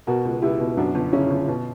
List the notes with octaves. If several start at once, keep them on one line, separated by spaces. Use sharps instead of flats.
B2 F#4 A#4
C#2
C#2 E4 G4
B2
F#2 D4 F#4
G1
C#3 C#4 E4
G1
B2